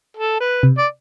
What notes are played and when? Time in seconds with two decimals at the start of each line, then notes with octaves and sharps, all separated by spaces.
0.17 A4
0.40 B4
0.63 C3
0.78 D5